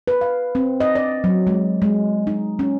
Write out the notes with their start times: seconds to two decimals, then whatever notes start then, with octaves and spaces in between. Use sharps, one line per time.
0.08 B4
0.21 F5
0.55 C4
0.80 D#5
0.95 D5
1.24 F#3
1.47 G#3
1.82 G#3
2.27 D#4
2.59 C#4